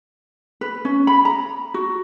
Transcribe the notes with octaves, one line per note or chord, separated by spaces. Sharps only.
B4
C#4
B5
A#5
F#4